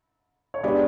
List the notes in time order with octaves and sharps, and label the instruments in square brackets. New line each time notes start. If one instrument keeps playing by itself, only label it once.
[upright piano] C#5
[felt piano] G#3 B3 D4 G4 [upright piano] D5